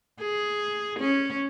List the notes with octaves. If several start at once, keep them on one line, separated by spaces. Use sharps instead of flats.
G#4
C#4